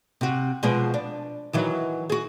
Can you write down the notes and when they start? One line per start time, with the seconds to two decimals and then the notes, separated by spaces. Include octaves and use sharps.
0.21 C3 F#4
0.63 B2 F3 G#3
0.94 D4
1.53 D#3 E3 F#3
2.10 F#4 G#4